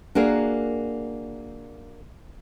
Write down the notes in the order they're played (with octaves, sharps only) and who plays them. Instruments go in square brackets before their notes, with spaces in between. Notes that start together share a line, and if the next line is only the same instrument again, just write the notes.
[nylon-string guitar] A#3 D4 F#4 G#4 A#4